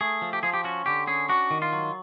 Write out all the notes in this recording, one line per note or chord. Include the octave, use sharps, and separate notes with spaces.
A3 G#4
F3
G4
F3 G#4
G4
C#4 F#4
D3 G4
C#4 G#4
D4 F#4
D#3
F4
F#3